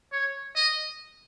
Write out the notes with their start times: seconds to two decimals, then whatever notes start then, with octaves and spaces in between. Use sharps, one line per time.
0.12 C#5
0.55 D#5